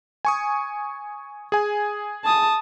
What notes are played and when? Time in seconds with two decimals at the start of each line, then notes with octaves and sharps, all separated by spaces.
0.25 G#5 C#6 D#6
1.52 G#4 G#5
2.25 A5 D#6